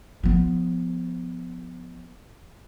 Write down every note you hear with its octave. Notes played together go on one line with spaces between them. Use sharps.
F3 B3